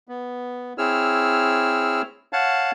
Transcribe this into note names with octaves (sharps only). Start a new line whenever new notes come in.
B3
C4 E4 G#4 C#5 E6 F6
C#5 F5 F#5 A5